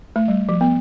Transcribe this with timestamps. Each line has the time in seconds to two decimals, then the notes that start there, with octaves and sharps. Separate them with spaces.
0.16 A3
0.28 G3
0.49 F3
0.61 B3